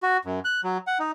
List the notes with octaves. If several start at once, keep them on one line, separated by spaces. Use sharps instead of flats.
F#4
F#2
F#6
F#3
F#5
D#4